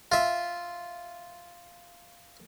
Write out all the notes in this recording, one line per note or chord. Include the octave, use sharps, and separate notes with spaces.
F4 E5